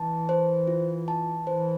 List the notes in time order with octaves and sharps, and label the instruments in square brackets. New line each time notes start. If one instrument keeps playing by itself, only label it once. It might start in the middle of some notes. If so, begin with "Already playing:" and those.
Already playing: [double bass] E3 [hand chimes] A5
[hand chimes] C5
F4
A5
[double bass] E3 [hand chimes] C5